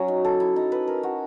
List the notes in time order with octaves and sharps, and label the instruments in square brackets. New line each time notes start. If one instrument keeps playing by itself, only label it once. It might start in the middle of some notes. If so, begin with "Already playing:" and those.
Already playing: [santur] F#3 C#4
D#4
A4
E4
D#4
B4
A#4
F#4